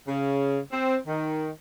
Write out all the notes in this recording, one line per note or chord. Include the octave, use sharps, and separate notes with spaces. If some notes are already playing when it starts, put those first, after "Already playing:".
C#3
C4
D#3